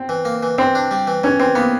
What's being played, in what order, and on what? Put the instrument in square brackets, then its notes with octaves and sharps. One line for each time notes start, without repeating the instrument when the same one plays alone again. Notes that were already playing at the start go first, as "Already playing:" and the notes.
Already playing: [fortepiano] C4
[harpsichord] E3
A#3
E3
[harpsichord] E3 [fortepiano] C4
[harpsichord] D4
G3
E3
[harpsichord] E3 [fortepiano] C#4
[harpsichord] E3 [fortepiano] C4
[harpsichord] A#3 [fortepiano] B3